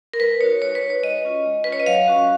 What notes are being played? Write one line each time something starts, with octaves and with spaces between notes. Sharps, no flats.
A#4
G#3 B4
D#4 F#4 C#5
G#3 C#5
B4
D#4 F#4
C#5
G#3 D#5
C#4 F4
G#3
C#4 F4 B4
C#5
D#5
F#3 F5
C#4 F#4